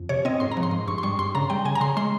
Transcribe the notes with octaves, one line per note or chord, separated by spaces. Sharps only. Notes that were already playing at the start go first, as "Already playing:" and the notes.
Already playing: F2
C3 C#5
C4 D#5
G#2 C6
A#5
F3
C6
G#2
G2 C#6
C6
G3 C#6
G2 C6
C#3 A#5
G3 G5
C#3 G#5
A#5
C#3 C6
G#3 C6